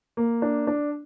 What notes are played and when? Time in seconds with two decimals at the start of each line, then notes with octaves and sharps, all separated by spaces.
0.17 A#3
0.42 D4
0.67 D4